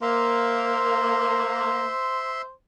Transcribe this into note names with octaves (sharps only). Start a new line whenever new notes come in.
A#3 C5 E5 C6